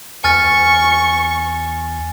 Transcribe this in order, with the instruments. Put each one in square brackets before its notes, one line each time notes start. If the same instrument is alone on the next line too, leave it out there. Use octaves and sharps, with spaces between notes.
[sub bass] E2 [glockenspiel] G#5 F6 A6 [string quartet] C#6